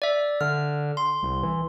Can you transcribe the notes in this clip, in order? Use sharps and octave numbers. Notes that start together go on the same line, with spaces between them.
D5 E5
D3 F6
C6
C2
E3